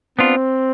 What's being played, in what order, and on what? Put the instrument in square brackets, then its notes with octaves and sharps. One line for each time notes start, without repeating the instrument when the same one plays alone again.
[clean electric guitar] B3 D4 F4 [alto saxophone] C4